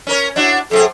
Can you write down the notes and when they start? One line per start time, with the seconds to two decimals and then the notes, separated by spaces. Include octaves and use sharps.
0.07 C#4 A#4 C#5
0.36 D4 E4 F#4
0.71 F#2 C3 G#4 A4